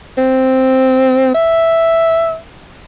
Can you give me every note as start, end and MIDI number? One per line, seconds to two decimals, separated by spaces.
0.18 1.32 60
1.35 2.37 76